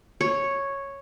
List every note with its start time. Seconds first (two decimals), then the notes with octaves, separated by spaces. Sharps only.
0.21 C#5